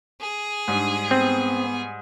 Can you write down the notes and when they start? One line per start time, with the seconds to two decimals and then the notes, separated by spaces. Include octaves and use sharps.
0.21 G#4
0.68 G#2 G3 D4
1.11 B3 C4